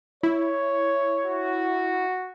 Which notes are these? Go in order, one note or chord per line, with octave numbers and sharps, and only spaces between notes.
E4 C#5
F#4